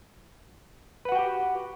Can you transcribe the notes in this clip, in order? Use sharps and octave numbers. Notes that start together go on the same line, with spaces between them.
F#4 G4 B4 F#5 G5